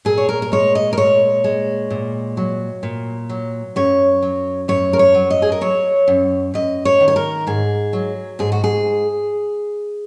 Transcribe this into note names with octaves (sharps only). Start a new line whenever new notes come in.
A#2 G#4
C#5
A#4
A#4
G#3 C#5
D#5
A#4
A#2 C#5
G#3
A#2
F#3
A#2
F#3
F#2 C#5
F#3
F#2 C#5
A#4
C#5
F#3
D#5
G#4
A#4
F#3 C#5
F#2
F#2 D#5
C#5
D#3
C#5
A#4
G#2 G#4
F#3
G#2 G#4
F#4
G#4